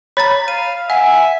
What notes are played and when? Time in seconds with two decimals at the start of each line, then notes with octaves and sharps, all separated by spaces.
0.17 C#5 A#5 B5 A6 B6
0.48 F5 D#7
0.90 E5 F#5 G#5